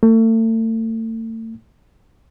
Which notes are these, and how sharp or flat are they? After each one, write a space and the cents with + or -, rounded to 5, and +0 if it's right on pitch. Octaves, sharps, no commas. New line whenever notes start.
A3 +35